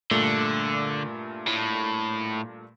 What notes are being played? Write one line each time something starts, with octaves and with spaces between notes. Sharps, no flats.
G2 A#2 D3 A3
A2